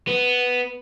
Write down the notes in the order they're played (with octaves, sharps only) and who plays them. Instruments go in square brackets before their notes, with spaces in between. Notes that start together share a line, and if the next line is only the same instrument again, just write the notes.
[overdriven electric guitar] B3